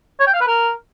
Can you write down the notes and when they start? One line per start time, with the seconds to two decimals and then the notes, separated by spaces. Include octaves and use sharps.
0.20 C#5
0.27 G5
0.34 F5
0.40 B4
0.47 A#4